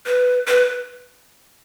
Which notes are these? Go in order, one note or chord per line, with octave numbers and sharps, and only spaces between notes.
B4
B4